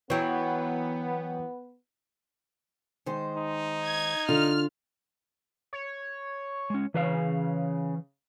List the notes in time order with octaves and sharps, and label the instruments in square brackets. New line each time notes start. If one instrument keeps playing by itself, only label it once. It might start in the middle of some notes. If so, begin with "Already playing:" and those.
[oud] E3 F#3 [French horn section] B3 [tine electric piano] C#5 G5
[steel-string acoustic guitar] D#3 G#3 C5
[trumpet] D#4
[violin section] G#6
[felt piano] D3 [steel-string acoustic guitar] F4 [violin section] F6
[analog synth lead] C#5
[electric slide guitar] G#3 C#4
[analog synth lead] C#3 [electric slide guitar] E3 B4 F5